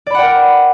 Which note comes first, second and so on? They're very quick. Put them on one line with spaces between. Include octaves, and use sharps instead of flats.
D5 B5 F#5 G5 A#4